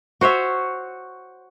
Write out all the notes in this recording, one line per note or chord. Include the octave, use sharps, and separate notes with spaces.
F#4 C5 C#5 E5